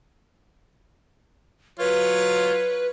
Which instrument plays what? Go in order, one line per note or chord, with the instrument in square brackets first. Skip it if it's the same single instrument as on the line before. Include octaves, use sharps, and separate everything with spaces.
[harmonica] F#3 F4 C#5 [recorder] B4